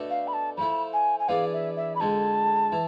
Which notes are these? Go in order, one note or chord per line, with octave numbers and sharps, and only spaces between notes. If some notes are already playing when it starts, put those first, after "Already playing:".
Already playing: B2 A3 D4 A4
F5
B5
A5
F3 A3 E4 B5
G#5
G#5
E3 B3 D4 G#4 D5 F5
E5
E5
B5
F2 D3 G#3 A5
E3 E4